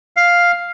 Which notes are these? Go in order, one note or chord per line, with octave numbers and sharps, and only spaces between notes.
F5